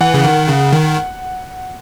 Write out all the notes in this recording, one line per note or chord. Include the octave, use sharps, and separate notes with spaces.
E3 F#5
C#3
D#3
C#3
D#3